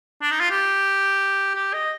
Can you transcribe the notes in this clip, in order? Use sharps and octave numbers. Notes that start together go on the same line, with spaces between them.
D4
D#4
F4
G4
G4
D#5